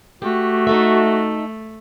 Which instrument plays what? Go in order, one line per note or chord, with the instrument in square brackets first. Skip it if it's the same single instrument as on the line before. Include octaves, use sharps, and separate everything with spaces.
[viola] A3 [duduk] F#4 [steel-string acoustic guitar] G4
[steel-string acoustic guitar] D#4 A4 E5